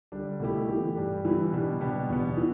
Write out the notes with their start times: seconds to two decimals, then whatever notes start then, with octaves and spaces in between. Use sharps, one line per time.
0.12 D3 G3 D4
0.40 B2 A3 E4 G4
0.69 E3 A3 G4
0.96 G2 G3 D4 G4
1.25 E3 G3 B3 E4
1.53 B2 G3 D4 G4
1.81 B2 B3 D4 G4
2.10 E2 B2 B3
2.38 E3